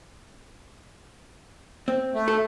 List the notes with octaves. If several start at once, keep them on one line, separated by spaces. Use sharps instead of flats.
C4
A3
A4